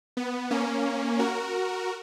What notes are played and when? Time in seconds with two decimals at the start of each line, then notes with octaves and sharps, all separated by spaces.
0.17 B3
0.51 A#3 C#4
1.19 F#4 A#4